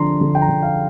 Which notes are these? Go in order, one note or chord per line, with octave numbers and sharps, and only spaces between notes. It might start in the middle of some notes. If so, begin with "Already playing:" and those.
Already playing: D3 F3 D4 A#5 C6
D3
G5
A#5
D3
F5